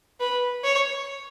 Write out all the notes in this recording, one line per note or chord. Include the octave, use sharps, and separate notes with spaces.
B4
C#5